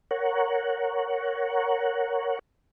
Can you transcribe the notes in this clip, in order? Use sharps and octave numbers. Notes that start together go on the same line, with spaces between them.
A#4 C#5 F#5